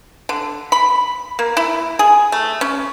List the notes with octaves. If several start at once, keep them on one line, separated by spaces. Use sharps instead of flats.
D3
B5
A#3
E4
G#4
A3
C#4